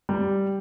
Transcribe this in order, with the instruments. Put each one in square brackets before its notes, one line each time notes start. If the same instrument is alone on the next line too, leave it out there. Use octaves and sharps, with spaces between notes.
[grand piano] G3